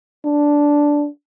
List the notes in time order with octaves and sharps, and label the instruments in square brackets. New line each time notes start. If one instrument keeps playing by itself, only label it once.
[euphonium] D4